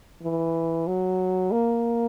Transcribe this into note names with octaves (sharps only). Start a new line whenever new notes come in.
E3
F#3
A#3